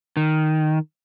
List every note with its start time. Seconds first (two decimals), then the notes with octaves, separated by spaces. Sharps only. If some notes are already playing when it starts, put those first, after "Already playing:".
0.17 D#3